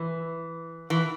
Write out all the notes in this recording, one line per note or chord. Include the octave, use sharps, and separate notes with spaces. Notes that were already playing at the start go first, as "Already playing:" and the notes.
Already playing: E3
E3